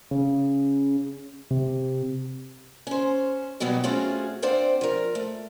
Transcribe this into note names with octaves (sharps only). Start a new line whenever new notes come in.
C#3
C3
C#4 C5
B2 F#3 G3 B3 D#4
A3 C4 C#4 F4 F#4 G#4
C4 D4 C5 D5 F5 F#5
F3 A#4
A3